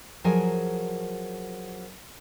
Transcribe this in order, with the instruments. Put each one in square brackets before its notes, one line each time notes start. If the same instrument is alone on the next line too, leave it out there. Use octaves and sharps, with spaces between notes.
[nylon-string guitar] F3 F#3 G#4 A#4 G#5